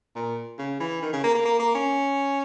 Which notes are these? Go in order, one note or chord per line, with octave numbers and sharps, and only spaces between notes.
A#2
C#3
E3
D#3
C#3
A#3
A#3
A#3
A#3
C#4